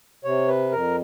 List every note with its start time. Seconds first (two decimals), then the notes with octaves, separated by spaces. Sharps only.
0.24 C3 C#5
0.48 B4
0.71 F2 A#4